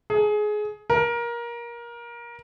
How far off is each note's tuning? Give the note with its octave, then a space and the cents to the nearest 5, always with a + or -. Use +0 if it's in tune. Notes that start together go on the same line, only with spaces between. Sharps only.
G#4 +20
A#4 +20